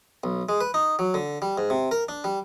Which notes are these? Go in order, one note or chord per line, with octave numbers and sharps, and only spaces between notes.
B1
G#3
B4
D#4
F#3
D3
G3
G#2
C3
A#4
D4
G3